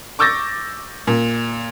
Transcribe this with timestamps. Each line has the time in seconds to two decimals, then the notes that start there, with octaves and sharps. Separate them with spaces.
0.19 C#6 D6 E6 G6 A6 A#6
1.07 A#2